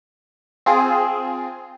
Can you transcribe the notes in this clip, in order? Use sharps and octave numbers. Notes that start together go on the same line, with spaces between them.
C4 F4 G#4